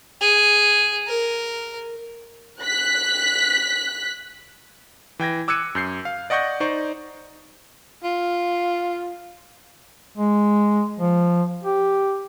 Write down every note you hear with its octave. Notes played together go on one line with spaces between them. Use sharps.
G#4
A#4
F#6 B6
E3 G5 G#6 A#6
D6 E6 F#6 G#6 C#7 D#7
F#2 G6 C7
F5
D5 D#5 F#5 C#6 G6 A#6
D#4 C5 D5 C#6
F4
G#3
F3
G4